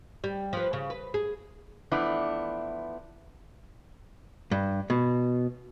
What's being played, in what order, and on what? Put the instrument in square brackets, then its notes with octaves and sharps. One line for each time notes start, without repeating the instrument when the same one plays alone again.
[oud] G3
F3 B4
C#3
B4
G#4
[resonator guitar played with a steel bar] E3 F3 A3 B3 D4 E4
[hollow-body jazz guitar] G2
B2